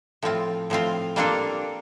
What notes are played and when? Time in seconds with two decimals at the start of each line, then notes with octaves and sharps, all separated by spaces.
0.22 A2 F3 C4 F4
0.70 A2 F3 C4 F4
1.16 G3 A#3 D4 F4 A4